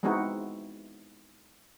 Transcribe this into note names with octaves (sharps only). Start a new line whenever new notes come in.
G#3 B3 C4 D#4 E4 F#4